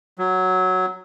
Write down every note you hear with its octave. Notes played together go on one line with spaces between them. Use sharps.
F#3